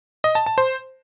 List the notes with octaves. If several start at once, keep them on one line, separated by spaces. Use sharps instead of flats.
D#5
A5
A5
C5